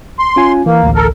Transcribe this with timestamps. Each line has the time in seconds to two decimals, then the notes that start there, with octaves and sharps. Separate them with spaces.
0.19 C6
0.36 C#4 F4 G#5
0.66 E3 A#3
0.83 A1 D2
0.95 A4 A#4